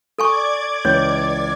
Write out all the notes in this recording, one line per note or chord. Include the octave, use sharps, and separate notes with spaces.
A4 D5 G#5 C#6 D6 G#6
C#2 E3 C#5